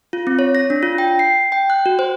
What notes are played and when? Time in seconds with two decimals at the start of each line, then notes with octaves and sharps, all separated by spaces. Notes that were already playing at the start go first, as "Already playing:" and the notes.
0.13 F4
0.27 C4
0.39 C#5
0.55 A#6
0.70 D4
0.83 F4
0.98 G5
1.19 C7
1.52 G5
1.70 F#6
1.86 F#4
1.99 C5